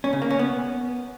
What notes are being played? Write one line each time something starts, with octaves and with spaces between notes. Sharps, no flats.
C#4
C#3
A#3
C#4
B3